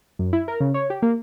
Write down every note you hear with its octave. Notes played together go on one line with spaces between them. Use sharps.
F#2
E4
A#4
C#3
C#5
G4
A#3